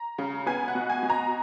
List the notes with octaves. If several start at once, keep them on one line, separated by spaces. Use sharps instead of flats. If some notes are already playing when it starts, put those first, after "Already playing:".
Already playing: A#5
C#3
B3 G#5
F#5
B2
G#5
B2
A#5